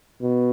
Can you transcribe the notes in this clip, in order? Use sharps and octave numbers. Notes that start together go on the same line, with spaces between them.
B2